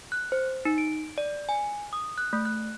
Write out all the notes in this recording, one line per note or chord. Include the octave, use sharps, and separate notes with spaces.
F#6
C5
D#4
D7
D5
G#5
D#6
F#6
A3
F#6